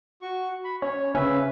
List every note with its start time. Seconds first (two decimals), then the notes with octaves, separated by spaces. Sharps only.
0.22 F#4 C#6
0.64 B5
0.82 C#4 C#5
1.15 C#3 C#4 B4 E5